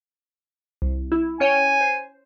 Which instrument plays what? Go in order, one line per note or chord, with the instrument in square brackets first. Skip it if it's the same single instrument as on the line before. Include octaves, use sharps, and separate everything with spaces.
[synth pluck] C2
E4
[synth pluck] C#4 C#5 G5 [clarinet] G#5
[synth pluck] C5